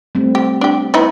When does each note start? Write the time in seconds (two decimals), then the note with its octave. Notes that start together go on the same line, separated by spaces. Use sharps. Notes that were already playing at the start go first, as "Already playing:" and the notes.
0.15 G3 A3 C4
0.35 G4
0.61 D4 G4
0.94 B3 D#4 E4